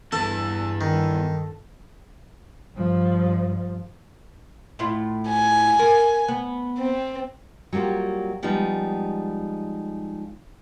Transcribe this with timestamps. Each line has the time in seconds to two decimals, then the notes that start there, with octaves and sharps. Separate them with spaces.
0.12 E2 G2 E3 A4 A5
0.81 D#3
2.75 G2 F3
4.79 A2 E4 F4
5.29 G#5
5.79 A#4
6.28 B3
6.78 C4
7.73 F#3 G3 A#3 F4 G4
8.43 F3 G3 G#3 B3 D#4